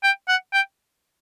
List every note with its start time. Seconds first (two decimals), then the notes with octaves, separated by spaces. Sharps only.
0.03 G5
0.28 F#5
0.53 G5